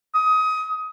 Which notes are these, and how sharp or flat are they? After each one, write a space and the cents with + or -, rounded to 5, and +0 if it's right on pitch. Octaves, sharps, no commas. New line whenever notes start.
D#6 +20